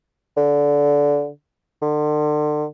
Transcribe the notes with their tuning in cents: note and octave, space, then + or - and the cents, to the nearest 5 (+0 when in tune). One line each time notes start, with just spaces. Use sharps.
D3 -20
D3 +40